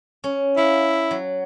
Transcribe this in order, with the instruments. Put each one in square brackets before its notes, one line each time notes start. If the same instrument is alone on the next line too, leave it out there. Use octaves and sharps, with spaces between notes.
[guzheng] C#4
[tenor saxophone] E4 [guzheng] F5
[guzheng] F#3